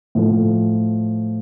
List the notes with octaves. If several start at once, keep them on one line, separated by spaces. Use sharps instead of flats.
A2 F3 A3 F4